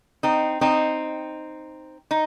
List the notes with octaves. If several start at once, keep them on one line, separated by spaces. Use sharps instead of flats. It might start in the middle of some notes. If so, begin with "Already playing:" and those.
C4 D#4
C4 D#4
D#4